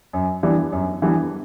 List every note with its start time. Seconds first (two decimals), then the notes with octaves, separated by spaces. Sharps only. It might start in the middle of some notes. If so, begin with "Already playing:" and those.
0.13 F#2
0.43 E3 G3 B3 D4
0.72 F#2
1.02 E3 G3 B3 D4